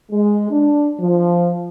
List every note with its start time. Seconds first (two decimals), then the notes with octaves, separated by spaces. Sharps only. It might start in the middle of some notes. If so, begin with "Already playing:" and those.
0.11 G#3
0.50 D4
0.99 F3